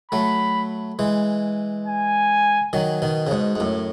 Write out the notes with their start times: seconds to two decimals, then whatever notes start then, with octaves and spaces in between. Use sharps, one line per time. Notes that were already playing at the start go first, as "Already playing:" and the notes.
0.11 F#3 A3 B5
0.99 E3 G#3
1.87 G#5
2.73 D#3 F#3
3.02 B2 D#3
3.27 C#3
3.31 G#2 B2
3.55 G#2
3.60 F#2 A2